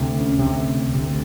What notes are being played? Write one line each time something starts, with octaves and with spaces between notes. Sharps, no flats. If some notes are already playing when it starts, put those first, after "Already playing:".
Already playing: D2 C3
C#4
D2 C3
D2 C3